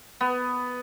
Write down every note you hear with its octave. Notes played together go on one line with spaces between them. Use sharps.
B3